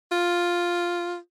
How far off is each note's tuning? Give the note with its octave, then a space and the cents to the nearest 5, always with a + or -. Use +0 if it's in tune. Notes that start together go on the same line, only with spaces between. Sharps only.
F4 +0